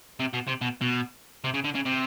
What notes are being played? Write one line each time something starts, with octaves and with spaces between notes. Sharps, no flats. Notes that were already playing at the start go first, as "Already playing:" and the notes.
C3
B2
C3
B2
B2
C3
C#3
D3
C#3
C3